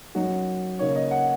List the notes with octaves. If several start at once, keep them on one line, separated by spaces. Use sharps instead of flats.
F#2 F#3 D#4 F#4
C#3 A#3 D#4 C#5
D#5
F#5